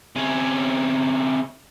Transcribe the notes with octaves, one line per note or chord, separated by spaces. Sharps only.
C3 C#4